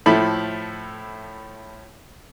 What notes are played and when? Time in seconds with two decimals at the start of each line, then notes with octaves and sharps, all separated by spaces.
0.06 A2 F3 E4 A4 B5